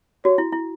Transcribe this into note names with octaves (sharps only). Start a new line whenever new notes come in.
F#4 C#5
E4
E4